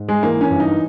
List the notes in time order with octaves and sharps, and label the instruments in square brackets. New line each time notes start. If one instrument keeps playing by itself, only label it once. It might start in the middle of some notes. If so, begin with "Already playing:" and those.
Already playing: [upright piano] G#2
G#3
E3 A#3
C#4
G2
D#4